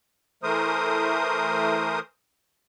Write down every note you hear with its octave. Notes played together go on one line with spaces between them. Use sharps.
E3 A3 A#4 C5 D#6